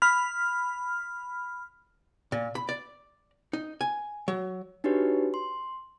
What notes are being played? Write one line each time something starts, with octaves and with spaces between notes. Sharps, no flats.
B5 F6
A#2
B5
D5
D#4
G#5
F#3
D4 D#4 F#4 G4 B4 C#5
C6